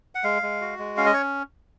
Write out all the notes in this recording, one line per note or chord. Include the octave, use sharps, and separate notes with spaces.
F#5
G#3 F5
G#3
F#4
G#3
C#4 F5
D#5
C#5